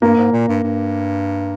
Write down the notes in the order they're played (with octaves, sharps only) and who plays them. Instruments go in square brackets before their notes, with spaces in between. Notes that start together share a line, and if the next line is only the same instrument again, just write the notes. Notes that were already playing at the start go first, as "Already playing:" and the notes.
[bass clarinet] G2 [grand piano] A#3
[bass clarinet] G#2
A#2
G2
G2